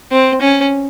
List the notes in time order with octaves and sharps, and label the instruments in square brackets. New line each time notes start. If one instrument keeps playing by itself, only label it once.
[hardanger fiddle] C4
C#4